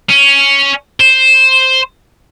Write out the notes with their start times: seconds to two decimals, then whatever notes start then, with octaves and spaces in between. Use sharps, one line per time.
0.09 C#4
1.00 C5